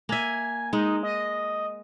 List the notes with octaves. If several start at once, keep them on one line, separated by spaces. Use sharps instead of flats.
A#3 E5 G#5
G#3 D#4
D#5